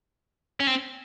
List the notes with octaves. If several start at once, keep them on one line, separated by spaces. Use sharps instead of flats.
C#4
C4